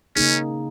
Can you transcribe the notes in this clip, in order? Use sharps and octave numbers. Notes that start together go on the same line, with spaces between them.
C#3 A#3 C#4 D#4 G#4